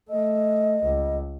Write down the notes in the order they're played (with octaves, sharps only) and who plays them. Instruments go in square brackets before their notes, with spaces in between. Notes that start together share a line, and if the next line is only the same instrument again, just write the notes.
[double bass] A3 [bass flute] D#5
[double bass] C#2